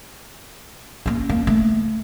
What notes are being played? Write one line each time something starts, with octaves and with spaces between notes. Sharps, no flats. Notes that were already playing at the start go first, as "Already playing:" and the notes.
A#3 C#4
A#3
A3